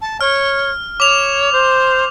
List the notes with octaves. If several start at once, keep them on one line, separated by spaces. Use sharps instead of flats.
A5
C#5 F6
C#5 D6 F7
C5